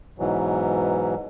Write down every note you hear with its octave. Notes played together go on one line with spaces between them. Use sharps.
G#2 B2 E3 F#3